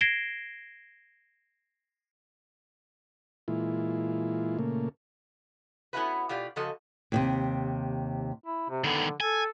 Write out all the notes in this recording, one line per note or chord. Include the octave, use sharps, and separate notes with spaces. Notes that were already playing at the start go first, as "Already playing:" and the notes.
G#6 A#6 C7 D7 E7 G7
A#2 E3 G#3 E4 F4
A#2 C#3 A3 A#3
B3 C#4 D#4 E4 F#4 B4
B2 F4 G4 D5
C#3 F3 F#4 A4 D#5
D#2 A2 C3
E4
C3
D3 D#3 B3
A4 G#5